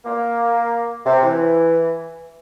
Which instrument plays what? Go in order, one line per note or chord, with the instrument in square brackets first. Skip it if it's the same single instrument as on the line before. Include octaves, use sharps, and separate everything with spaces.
[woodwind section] A#3
C3
E3